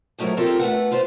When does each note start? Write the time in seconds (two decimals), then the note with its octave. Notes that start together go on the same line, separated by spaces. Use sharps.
0.18 F3 F#3 A3 A#4 C#5
0.37 C4 F4 G4 A4 A#4
0.59 A3 B4 F#5
0.91 F4 B4 C5